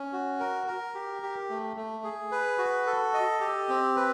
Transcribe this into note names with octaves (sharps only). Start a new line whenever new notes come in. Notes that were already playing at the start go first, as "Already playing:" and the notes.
Already playing: C#4
F#4
A#4
A#4
G4
G4
A3
A3
G#4
B4
F#4
A4
D#5
G4
C4
B4